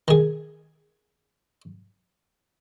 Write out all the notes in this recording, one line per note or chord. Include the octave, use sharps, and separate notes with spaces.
D#3 G#4